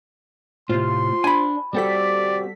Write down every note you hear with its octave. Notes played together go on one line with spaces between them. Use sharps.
A2 C3 F4 C5 C6
D4 G#5 B5
G3 C4 F#4 G4 A4 D5 B6